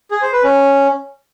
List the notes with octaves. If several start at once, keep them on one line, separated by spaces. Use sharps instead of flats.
G#4
C5
B4
C#4